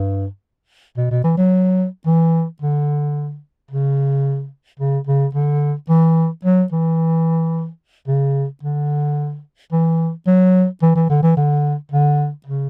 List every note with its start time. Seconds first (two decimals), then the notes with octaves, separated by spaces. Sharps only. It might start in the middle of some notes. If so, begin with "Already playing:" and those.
Already playing: G2
0.97 B2
1.11 B2
1.24 E3
1.38 F#3
2.06 E3
2.62 D3
3.71 C#3
4.80 C#3
5.07 C#3
5.35 D3
5.89 E3
6.45 F#3
6.72 E3
8.08 C#3
8.63 D3
9.72 E3
10.27 F#3
10.82 E3
10.96 E3
11.09 D3
11.23 E3
11.37 D3
11.92 D3
12.46 C#3